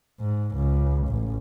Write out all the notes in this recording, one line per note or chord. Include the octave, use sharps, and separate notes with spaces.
G#2
C#2
A1